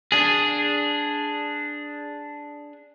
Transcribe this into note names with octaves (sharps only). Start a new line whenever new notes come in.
D4 G#4